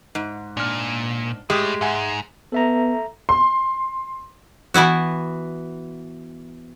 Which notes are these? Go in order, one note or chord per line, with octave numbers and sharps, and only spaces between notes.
G#2
A#2 D4 F6
A2 G#3 A3 G4 D#6
G#2 E5 F#5 G#5
B3 A4 E5 A#5
C6
E3 B3 E4 F#4